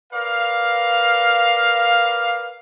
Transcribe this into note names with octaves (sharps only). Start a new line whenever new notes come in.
A#4 B4 D5 F5